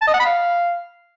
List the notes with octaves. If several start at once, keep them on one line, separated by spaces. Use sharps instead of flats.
A5
D#5
F#5
B5
F5